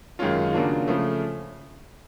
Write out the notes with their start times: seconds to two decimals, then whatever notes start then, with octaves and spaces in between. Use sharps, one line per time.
0.19 F#2 D#3 G#3 C#4 F4
0.53 C#3 F#3 A#3 D4 F4
0.88 C#3 F3 A3